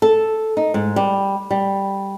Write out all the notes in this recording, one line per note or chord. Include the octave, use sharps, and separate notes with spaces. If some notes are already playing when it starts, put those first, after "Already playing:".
A4
D#4
G#2
G3
G3